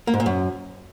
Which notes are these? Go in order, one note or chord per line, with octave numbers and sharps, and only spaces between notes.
A#3
G#2
A#2
F#2